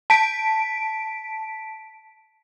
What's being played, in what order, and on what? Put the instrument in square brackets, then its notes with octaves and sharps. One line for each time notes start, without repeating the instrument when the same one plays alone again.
[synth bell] A5 B6 D7